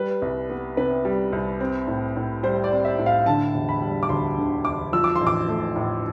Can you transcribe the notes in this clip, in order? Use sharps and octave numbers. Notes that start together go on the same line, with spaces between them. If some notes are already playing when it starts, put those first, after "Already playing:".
Already playing: G3 B4
C2
B3
C3 B4
G3
C2
C4
A2
A2
G3 C5
D5
C4
E5
A2
F5
D3 A5
E1
B5
G3
D6
D2 C6
D3
E1 D6
F3 E6
D6
A1 C6
D6
A3
A2